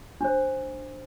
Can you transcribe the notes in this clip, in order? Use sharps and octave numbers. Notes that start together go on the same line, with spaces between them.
D4 C5